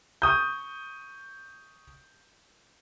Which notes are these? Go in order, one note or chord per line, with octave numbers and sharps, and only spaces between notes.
C#6 D#6 G6